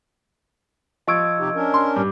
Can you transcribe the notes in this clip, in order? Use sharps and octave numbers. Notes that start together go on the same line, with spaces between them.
F3 D#5 C#6 E6 G#6 D7
C3 D#4 G4
C#4 D4 A#4
C6
G2 D6